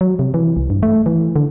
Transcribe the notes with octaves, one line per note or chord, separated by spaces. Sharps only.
F#3
C3
E3
C2
G2
A3
E3
D3